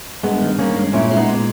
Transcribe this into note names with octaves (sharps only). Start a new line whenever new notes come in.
G2 G#3 B3
D#3
G2 A#3 C#4
G#3
A#2 C#4 E4
G#3 E4
B3 D#4
A#2